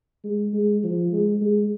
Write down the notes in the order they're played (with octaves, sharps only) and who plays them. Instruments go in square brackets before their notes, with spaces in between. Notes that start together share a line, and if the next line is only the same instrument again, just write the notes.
[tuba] G#3
G#3
F3
G#3
G#3